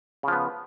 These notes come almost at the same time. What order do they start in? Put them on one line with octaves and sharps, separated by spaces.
C#3 F3 B3